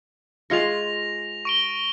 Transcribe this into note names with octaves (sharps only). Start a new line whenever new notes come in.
G#3 F4 C#6 A#6 F7
C#6 D7 G7